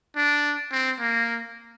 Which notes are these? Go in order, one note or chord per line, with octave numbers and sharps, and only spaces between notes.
D4
C4
A#3